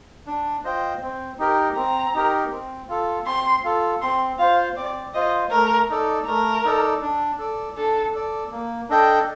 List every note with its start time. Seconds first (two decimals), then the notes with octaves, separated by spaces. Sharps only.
0.27 D4
0.64 F4 C5 D#5 G5
1.02 C4
1.39 D#4 G4 A#4
1.76 C4 A#5
2.14 D#4 G4 A#4
2.52 C4
2.88 F4 A4
3.26 C4 C6
3.64 F4 A4
4.02 C4 C6
4.39 F4 C5 F5
4.76 C4 D5
5.14 F4 C5 D#5
5.51 A3 A#4
5.89 D#4 A4 D5
6.27 A3 A#4
6.64 D#4 A4 D5
7.02 D4
7.39 A4 D5
7.77 D4 A4
8.14 A4 D5
8.51 A#3
8.89 D4 A4 D#5 G5